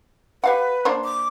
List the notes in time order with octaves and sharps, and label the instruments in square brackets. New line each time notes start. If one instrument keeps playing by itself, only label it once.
[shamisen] G4 F5 F#5 [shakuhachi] B4
[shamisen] A#3 D4 C5
[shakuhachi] D6